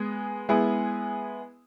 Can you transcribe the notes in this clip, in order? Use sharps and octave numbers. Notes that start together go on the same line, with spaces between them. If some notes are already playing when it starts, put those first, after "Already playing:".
Already playing: G#3 B3 G#4
G#3 B3 E4 G#4